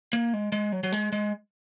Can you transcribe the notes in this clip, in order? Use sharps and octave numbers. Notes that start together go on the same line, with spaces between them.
A#3
G#3
G#3
F#3
F#3
G#3
G#3